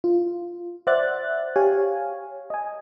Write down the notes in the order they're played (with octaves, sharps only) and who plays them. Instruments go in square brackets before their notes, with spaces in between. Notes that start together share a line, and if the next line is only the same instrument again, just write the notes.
[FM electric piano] F4
C5 D5 E5 F#5 F#6 A6
G4 C#5 F5 G#5
D#5 G#5